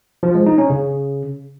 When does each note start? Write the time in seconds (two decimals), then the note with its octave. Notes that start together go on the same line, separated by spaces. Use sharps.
0.23 F3
0.35 G#3
0.46 D#4
0.58 C#4
0.70 C#3